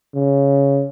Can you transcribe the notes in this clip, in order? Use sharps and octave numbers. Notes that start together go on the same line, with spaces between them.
C#3